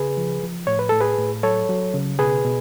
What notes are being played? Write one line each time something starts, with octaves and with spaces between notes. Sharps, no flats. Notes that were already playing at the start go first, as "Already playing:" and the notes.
Already playing: C#3 G#4 B4
F3
F3
A2 C#5
B4
A2 A4
G#4 B4
A2
F#3 A4 C#5
F#3
C#3
B2 G#4 B4
B2